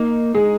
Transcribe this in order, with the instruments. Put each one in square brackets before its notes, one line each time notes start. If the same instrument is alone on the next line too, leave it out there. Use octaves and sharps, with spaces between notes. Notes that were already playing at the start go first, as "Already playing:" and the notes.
Already playing: [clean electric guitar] A#3 [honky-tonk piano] D#4
[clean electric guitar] G#3 [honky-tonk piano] G#4